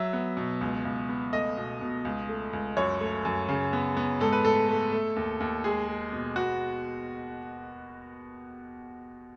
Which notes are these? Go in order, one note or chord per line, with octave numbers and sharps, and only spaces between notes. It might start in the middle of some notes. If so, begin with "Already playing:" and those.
Already playing: F#3 E5
B3
B2
C#2
C#2
B3
A3 D#5
B2
B2
C#2
A3
C#2
F#2 C#5
A3
F#2
C#3
B3
B3
G#2 A4
B4
A3 A4
A3
A3
D#2
D#2
G#3 G#4
G#3
B2
B3 F#4